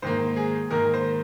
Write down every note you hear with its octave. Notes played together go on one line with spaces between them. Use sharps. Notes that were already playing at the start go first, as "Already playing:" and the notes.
G#2 D#3 A#3 C5
G#4
G#2 D#3 A#3 A#4
C5